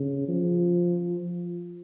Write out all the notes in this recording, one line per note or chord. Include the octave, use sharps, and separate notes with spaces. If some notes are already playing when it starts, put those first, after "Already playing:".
Already playing: C#3
F3